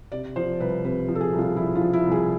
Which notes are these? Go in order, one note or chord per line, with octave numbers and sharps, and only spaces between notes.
C3 D5
F3 C5
C2 B4
C3 B4
F3
A4
G#4
C2
F4
F3 E4
F4
F3
E4
C2
G#4